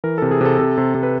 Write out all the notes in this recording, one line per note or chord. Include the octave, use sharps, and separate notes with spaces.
E3 A#4
C3 A4
G#4
C3 A4
C3
C3
C3
B4